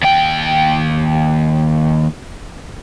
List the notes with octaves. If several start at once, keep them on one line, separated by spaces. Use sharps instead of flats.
D#2 G5